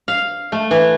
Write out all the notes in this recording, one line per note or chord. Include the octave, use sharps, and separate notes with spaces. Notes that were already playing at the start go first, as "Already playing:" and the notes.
F5
A3
E3